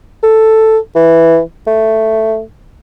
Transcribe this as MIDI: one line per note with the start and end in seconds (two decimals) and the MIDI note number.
0.23 0.78 69
0.95 1.40 52
1.67 2.41 57